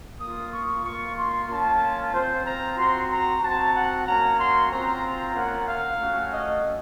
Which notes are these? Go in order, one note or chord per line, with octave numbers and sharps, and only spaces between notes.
A#3 F4 D#6
C#6
A#3 F4 C#6
C6
A#3 C#4 F4 A5
C4 F4 C5
A#5
C4 F#4 C6
A#5
C4 F#4 A5
F#5
A#3 C#4 F#4 A#5
C6
C4 F4 A#5
A#3 C#4 F4 F#5
F5
A3 C#4 F#4
D#5